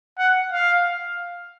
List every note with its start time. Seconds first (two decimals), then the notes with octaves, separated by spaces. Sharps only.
0.19 F#5
0.52 F5